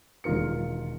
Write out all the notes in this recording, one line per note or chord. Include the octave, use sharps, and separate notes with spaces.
E1 D#3 F4 A#4 C#7